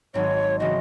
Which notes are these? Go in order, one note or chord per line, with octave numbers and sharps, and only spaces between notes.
G#1 G#2 F#3 C4 C#5
C#3 E3 C4 F#4 D#5